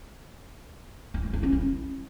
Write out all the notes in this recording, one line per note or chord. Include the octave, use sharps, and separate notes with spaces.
E4
G#3
E4
C#4
E4